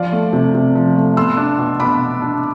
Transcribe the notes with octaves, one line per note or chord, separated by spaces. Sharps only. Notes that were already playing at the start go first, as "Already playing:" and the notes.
Already playing: F3 D5 F5
A3
C3
C3
F3
A3
B3 C6 E6
D4
B2
B2 B5 D6
B3
D4